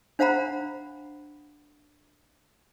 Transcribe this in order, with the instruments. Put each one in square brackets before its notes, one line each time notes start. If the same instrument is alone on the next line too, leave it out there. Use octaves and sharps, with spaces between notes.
[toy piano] D4 C5 F5 F#5 A#5 B5